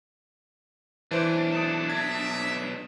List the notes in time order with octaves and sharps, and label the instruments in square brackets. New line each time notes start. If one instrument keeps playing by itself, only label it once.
[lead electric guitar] B1 D4 [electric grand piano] E3 C5 [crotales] D6 D7 D#7
[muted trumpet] A4 [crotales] D#6 D7 E7
[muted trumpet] E5 [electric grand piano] G#6